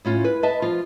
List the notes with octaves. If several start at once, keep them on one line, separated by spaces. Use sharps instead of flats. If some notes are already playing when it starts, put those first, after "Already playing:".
A2 C#4 F4
B4
B4 D#5 E5 A5
F3 F4